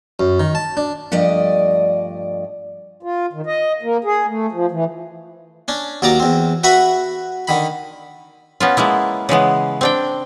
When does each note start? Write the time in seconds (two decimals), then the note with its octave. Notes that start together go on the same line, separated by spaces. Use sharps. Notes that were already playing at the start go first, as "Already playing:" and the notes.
0.20 F#2
0.40 D#3
0.55 A5
0.77 D4
1.12 G2 F3 A3 D5 D#5
3.03 F4
3.33 D#3
3.46 D#5
3.82 A#3
4.04 G#4
4.27 A3
4.52 F3
4.71 E3
5.68 C#4 D4
6.02 D#2 F#3 D5 A#5 D6
6.20 E2 C4
6.63 F#4 B4 E5 F#5 B5 C#6
7.47 D3 D#3 B5
8.60 B3 C#4 F4
8.77 G#3 A#3 B3 E4
9.29 C#3 E3 G#3 B3
9.81 C4 D4 G5